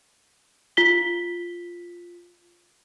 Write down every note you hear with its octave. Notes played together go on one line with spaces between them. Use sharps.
F4 B6 G7